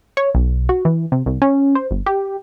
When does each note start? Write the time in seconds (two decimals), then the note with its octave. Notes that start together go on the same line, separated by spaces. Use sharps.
0.17 C#5
0.35 B1
0.69 F#4
0.85 E3
1.12 C3
1.26 C2
1.42 C#4
1.75 C5
1.91 G1
2.06 G4